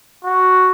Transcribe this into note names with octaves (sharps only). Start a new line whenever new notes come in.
F#4